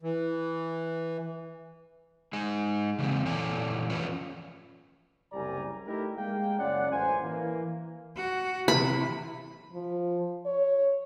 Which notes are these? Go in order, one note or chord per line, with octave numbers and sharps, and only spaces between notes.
E3
G#3 D#4 G#4
C#3 E3 G#3 C4
A#2 E3 A4 C#5 D5 G#5
F3 A3 C#4 F4 B4 C#5
F#1 C2 G3 D5 G#5 A#5
A3 D#4 E4 G4 A#4
G#3 A#3 G5
F#1 C#4 F4 D5 F#5
A1 F#2 C5 G#5
E3 A#3
F#4
C3 E3 B5
F3
C#5